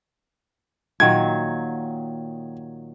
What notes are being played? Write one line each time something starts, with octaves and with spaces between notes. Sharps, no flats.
A#2 D#3 F#3 G#6